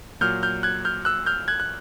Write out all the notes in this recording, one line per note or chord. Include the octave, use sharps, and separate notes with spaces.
A#2 F#3 F6 G6
F6 G6
F#6 G#6
F6 G6
E6 F#6
F6 G6
F#6 G#6
F#6